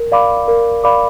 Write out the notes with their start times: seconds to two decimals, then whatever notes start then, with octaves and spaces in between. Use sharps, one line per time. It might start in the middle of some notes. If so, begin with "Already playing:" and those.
Already playing: A#4
0.12 D5 F5 B5 D6
0.48 A#4
0.84 D5 F5 B5 D6